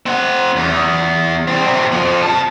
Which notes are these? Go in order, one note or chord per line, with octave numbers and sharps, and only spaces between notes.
C4 F#5
E2
G3 C4
B2 C4
F2 F3
B2 A5